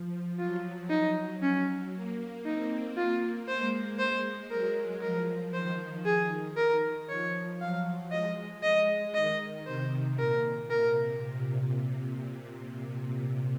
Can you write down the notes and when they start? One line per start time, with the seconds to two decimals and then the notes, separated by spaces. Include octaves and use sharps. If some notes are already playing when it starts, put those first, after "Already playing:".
Already playing: F3
0.38 F#3 F4
0.90 D#4
1.42 C#4
1.93 A#3
2.45 C4 D#4
2.96 A#3 F4
3.48 G#3 C5
3.99 G#3 C5
4.51 F#3 A#4
5.02 F3 A#4
5.53 D#3 C5
6.06 D#3 G#4
6.57 A#4
7.09 F3 C#5
7.60 F#3 F5
8.12 G#3 D#5
8.63 D#5
9.14 D#3 D#5
9.67 C3 C5
10.18 A#2 A#4
10.69 C3 A#4